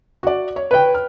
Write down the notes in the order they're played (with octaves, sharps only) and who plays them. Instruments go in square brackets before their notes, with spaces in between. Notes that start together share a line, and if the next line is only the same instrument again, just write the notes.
[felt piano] F#4 D5
C#5
[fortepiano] B4 G5
[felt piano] F6